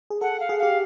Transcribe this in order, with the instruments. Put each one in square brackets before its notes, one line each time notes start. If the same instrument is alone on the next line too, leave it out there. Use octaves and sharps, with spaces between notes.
[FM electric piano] G#4
[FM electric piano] A4 [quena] F#5
[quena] F5
[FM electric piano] G#4
[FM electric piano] G4 [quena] F5